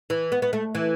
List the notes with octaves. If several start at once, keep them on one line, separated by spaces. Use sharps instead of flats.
E3
B3
B3
A3
E3